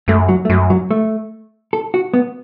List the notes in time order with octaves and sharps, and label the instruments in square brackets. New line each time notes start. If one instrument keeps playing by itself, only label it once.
[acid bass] F#2 [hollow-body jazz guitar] A3
[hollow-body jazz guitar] F#3
A3
[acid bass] F#2 [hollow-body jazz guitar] F#3
[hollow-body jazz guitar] F#3
A3
A4
F#4
B3